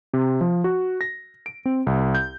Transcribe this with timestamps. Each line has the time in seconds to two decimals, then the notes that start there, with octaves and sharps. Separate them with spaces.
0.13 C3
0.41 F3
0.64 F#4
1.01 A#6
1.46 D7
1.65 C4
1.87 C2
2.15 G6